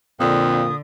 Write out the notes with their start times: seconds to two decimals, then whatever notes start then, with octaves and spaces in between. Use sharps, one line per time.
0.20 F2 A#2 D3 D#6